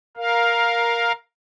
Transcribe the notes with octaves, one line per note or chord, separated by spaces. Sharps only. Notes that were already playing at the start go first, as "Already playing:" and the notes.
A#4 F5